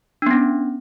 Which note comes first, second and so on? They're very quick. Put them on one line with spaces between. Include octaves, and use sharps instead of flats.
D4 B3 C#4